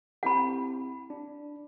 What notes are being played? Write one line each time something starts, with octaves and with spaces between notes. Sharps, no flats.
C4 E4 G4 F#5 B5
D4